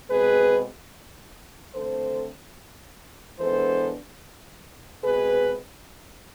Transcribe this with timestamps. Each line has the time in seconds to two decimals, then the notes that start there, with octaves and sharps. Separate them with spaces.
0.10 B2 G#3 C4 G#4 B4
1.75 D3 A3 C4 A4 C5
3.39 E3 G#3 B3 D4 A4 C5
5.04 B2 G#3 C4 G#4 B4